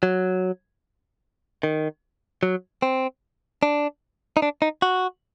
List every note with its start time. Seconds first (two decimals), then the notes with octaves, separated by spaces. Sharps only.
0.03 F#3
1.63 D#3
2.43 F#3
2.82 C4
3.63 D4
4.37 D#4
4.42 D4
4.62 D#4
4.82 F#4